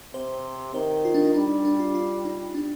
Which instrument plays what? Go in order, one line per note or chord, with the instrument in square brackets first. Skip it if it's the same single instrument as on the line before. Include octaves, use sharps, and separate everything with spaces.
[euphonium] C3 [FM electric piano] C5
[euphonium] D#3 [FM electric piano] C5
[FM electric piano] F4
D4
D#4
[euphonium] G3 [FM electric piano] D4
[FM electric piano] D4
F4
F4
D#4
D4